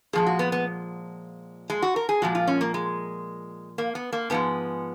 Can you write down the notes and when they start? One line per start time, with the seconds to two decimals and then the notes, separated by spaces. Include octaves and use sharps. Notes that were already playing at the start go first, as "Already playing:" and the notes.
0.13 A#2 F3 G#3 G#4
0.27 F#4
0.39 B3
0.52 B3
1.70 G#3
1.82 F#4
1.96 A#4
2.09 G#4
2.22 A#2 F3 G#3 F#4
2.35 F4
2.47 C#4
2.61 A#3
2.74 G#3
3.78 A#3
3.95 B3
4.13 A#3
4.30 G#2 F3 G#3 B3